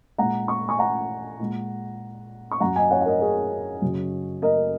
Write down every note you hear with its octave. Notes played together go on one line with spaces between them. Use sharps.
A#2 G#3 F#5 A#5
C#6
G#5 C#6
F#5 A#5
A#2 G#3
C#6
F#2 F#3 F#5 A#5
D#5 G#5
C#5 F#5
F#5
A#4 D#5
G#4 C#5
F#2 C#3 F#3
A#4 D#5